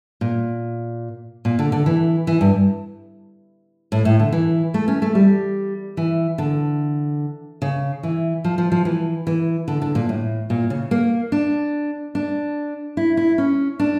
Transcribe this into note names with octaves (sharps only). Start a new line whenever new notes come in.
A#2
A#2
D3
D3
E3
E3
G2
A2
A2
D3
E3
A3
C#4
A3
G3
E3
D3
C#3
E3
F3
F3
F3
E3
E3
D3
D3
A#2
A2
A#2
C#3
A#3
D4
D4
E4
E4
C#4
D4